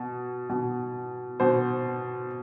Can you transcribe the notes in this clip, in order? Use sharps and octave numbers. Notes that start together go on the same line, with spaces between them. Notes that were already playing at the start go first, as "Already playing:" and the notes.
Already playing: B2
B2
B2 C5